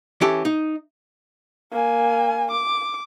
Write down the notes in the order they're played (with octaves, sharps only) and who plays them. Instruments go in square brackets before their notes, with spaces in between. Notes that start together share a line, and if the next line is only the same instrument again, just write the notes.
[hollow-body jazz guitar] E3 C#4 G4 A4
D#4
[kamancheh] A#3 G#5
D6